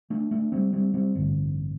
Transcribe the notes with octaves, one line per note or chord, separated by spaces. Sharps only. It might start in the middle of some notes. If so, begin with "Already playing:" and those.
A3 D4
A3 D4
G3 C4
G3 C4
G3 C4
A1 G2 D3